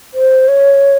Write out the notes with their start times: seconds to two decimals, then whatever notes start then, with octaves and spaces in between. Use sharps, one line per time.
0.14 C5
0.48 C#5